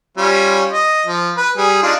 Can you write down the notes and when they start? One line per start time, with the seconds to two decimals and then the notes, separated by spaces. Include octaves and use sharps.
0.17 G3 C#4 F4
0.72 D#5
1.06 F3
1.37 B4
1.57 G3 G#4
1.83 D4 D#4 F4